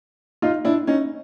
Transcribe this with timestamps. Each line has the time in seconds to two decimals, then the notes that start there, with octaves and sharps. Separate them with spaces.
0.42 D#4 F4
0.65 D4 E4
0.87 C#4 D#4